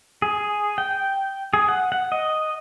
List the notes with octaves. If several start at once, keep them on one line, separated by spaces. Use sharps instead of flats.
G#4
G5
G#4
F#5
F#5
D#5